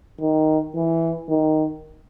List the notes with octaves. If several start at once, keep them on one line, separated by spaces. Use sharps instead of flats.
D#3
E3
D#3